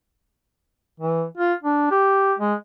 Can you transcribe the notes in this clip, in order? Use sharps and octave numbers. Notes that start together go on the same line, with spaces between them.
E3
F4
D4
G4
G#3